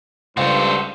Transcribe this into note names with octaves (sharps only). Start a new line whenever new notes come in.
C#2 G2 F#4 A4 C5